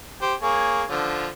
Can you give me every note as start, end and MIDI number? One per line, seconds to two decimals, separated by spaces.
0.22 0.34 67
0.22 0.34 72
0.22 0.34 84
0.42 0.84 58
0.42 0.84 68
0.42 0.84 73
0.90 1.28 50
0.90 1.28 53